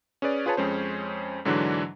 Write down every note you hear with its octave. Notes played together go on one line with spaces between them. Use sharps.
C#4 G#4 B4 D5
F4 G#4 B4 C#5 A5
F2 G#3 C#4 C5
G#2 D3 E3 F#3 D4